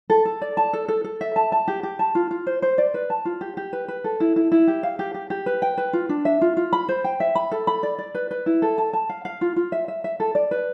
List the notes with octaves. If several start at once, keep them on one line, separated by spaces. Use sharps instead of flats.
A4
A4
D5
A5
A4
A4
A4
E5
A5
A5
G4
G4
A5
F4
F4
C5
C5
D5
B4
A5
F4
G4
G4
B4
B4
A4
E4
E4
E4
G4
F5
G4
G4
G4
B4
G5
B4
F4
D4
E5
F4
F4
B5
C5
G5
E5
B5
A4
B5
D5
D5
B4
B4
E4
A4
A5
A5
F5
F5
F4
F4
E5
E5
E5
A4
D5
B4